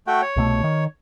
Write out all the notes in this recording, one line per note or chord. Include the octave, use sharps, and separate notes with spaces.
A3 F#4 G5
C#5
C2 B2 A3
D#3